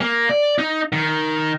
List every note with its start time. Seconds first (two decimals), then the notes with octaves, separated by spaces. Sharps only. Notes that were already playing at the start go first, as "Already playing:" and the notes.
0.01 A#3
0.29 D5
0.58 D#4
0.93 D#3